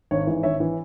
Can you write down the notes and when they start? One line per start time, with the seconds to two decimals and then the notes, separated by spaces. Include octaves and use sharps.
0.11 G#1 C#5
0.27 G#2 E3
0.43 G#1 C#5 E5
0.60 E3